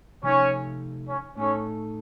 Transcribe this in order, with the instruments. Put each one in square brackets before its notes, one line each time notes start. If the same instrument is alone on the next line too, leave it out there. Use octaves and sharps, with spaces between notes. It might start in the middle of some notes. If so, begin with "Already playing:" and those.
[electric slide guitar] C3 F3 A3 D#4 [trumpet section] C#4 C#5
[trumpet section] C#4 C#5
[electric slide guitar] A2 A3 D#4 A4 [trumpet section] C#4 C#5